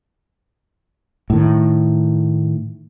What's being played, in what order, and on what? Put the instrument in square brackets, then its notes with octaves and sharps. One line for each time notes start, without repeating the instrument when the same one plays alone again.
[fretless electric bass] A2 D#3